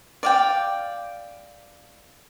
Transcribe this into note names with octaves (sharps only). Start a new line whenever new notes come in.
D5 F5 G5